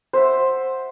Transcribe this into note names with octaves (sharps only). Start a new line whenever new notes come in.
C5 E5 F#5